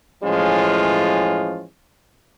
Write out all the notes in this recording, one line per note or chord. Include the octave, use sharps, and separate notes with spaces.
A2 E3 F3 G#3 C#4 F4